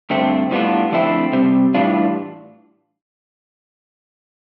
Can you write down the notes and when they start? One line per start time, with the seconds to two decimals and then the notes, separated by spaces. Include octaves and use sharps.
0.10 G2 D3 A3 C4
0.51 A2 G3 B3 D4 F4
0.92 F2 D3 A3 C4 E4
1.33 C3 G3 C4
1.74 A2 E3 G3 D4 F4